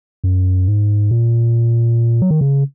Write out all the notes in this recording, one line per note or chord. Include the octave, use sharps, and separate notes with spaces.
F#2
G#2
A#2
F#3
D#3
C#3